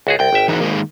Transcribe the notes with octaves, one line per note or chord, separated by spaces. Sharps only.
C#2 F#4 G#4
C2 G5
G#1 E5
E3 D#4 F#4
D#3 G#3 A#3